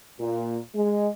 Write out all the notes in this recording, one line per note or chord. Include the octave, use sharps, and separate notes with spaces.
A#2
G#3